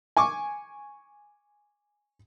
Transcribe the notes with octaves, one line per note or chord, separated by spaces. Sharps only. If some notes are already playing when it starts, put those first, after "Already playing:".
G#5 C#6 D6